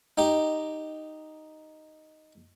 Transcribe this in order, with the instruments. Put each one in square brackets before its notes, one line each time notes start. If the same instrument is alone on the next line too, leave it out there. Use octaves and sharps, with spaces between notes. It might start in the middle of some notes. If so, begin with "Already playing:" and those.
[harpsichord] D#4 G4